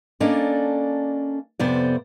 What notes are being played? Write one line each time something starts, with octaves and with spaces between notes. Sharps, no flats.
A#3 C#4 D4 A4 D5 D#5
F2 C3 B3 C5 D5